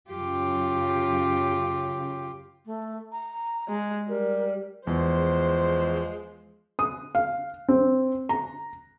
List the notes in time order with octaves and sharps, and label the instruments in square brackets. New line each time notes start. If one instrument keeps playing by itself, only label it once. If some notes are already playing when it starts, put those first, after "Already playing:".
[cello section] F#2 C#3 [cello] F4 G4
[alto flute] A3
A#5
[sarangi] G#3
[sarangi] G3 [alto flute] A#4
[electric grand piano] E2 [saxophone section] F3 G#3 [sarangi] C5
[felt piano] D#6
F5
C4
A#5